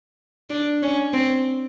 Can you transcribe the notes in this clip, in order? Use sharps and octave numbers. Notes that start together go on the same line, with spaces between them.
D4
C#4
C4